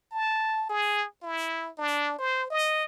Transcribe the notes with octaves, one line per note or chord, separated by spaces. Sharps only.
A5
G#4
E4
D4
C5
D#5